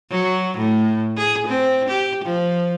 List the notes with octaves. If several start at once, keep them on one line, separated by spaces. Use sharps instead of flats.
F#3
A2
G#4
C4
G4
F3